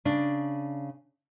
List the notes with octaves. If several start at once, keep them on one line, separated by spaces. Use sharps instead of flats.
C#3 D4